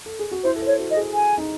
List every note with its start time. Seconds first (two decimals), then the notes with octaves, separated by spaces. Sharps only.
0.06 A4
0.19 G#4
0.31 F#4
0.44 E4 C5
0.56 A4
0.62 C5 C#5
0.78 F#4
0.91 D#5
0.97 G#4
1.14 G#5
1.38 D#4